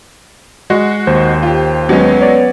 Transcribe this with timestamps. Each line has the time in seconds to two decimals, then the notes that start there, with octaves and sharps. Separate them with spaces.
0.70 G#3 F#4
1.07 D#2 C5
1.43 F4 G4
1.89 F#3 G#3 B3 C#4
2.21 C#5 D5